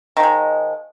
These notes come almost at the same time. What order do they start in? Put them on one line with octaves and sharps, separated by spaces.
D#3 F3 G#3